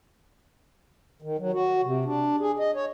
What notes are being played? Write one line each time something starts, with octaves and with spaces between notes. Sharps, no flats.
D#3
F#3
F#4
C3
D4
G#4
D#5
C#5